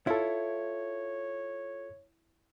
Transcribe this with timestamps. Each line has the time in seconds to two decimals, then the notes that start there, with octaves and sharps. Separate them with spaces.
0.07 E4 F4 A4 C#5